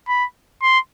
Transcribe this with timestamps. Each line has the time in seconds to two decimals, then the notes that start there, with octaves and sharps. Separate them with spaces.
0.08 B5
0.62 C6